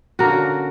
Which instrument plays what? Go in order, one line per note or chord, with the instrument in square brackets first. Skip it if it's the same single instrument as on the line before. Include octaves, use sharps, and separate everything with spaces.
[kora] D3 A#3 C#4 F#4 A#4